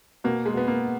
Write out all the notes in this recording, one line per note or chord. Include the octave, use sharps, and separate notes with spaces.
B2 A#3
G#3
B2 B3
A#3